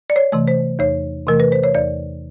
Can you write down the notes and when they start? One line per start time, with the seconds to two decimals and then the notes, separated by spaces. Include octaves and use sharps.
0.10 D5
0.16 C#5
0.32 C3 E3 A3
0.48 C5
0.79 E2 C#5
1.27 C3 E3 A3 A#4
1.40 B4
1.52 C5
1.63 C#5
1.75 E2 D5